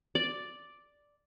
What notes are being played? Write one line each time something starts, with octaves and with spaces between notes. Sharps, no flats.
D5